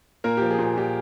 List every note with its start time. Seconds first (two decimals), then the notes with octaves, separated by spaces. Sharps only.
0.24 A#2 A#3 A#4
0.37 F3 G4
0.51 G#4
0.59 A#2
0.64 G#4
0.77 A#2 G4